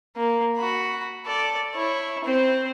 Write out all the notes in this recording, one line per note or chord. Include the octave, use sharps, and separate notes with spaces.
A#3
F#4 B5
A4 D5
E4 C#5
C4 C5